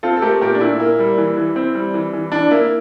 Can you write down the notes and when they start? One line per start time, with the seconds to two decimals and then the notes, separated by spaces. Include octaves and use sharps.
0.03 C4 F4 A4
0.17 A4
0.22 A3 G4 A#4
0.41 A#2 G4 A#4
0.55 D4
0.60 A#2 E4
0.80 A#3
0.99 G3
1.18 E3
1.37 E3
1.56 C4
1.75 G3
1.94 E3
2.13 E3
2.32 E3 D4
2.51 A#3 E4